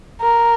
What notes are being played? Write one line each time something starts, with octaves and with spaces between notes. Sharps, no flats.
A#4